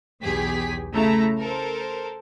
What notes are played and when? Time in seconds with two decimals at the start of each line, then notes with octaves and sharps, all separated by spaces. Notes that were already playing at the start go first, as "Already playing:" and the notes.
0.22 B1 E2 G4 G#4 B6
0.93 C#3 A3 E4 A4 A#5
1.39 A4 A#4 C5